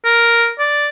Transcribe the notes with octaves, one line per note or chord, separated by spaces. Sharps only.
A#4
D5